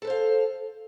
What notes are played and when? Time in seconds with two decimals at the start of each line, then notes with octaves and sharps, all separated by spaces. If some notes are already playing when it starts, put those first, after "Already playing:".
0.02 A4
0.05 B4
0.07 C5
0.10 F5